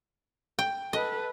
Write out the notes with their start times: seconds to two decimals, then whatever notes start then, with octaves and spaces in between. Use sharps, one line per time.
0.59 G5
0.93 A4 B4 D#5